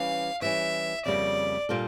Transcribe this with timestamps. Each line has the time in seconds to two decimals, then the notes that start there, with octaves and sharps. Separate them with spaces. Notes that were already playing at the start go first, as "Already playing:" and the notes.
Already playing: E3 G3 C#4 G4 F5
0.42 E3 G3 C#4 E5
1.05 F2 C#3 G3 A#3 D5
1.69 A#2 G3 D4 F4 A4